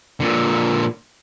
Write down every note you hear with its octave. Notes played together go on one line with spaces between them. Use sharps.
A#2 D3